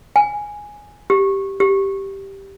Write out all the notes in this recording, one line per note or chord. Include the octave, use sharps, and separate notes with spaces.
G#5
G4
G4